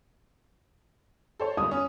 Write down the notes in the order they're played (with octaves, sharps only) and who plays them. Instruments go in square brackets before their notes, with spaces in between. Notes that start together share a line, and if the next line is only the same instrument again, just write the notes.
[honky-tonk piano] A4 C5 C#5
[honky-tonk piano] G2 [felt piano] D#6
[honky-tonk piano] C#4